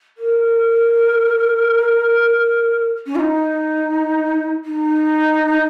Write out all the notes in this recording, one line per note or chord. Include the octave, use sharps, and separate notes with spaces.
A#4
C#4
F4
D#4
D#4